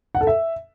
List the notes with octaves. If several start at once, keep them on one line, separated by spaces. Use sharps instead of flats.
F#5
A4
E5